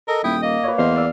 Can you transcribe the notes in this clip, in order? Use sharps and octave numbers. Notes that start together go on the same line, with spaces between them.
A4 A#4 D#5
D#1 E4 G5 D#6
A#3 D#5
B4 C#5
E2 C5 D#5 F5
D5 E6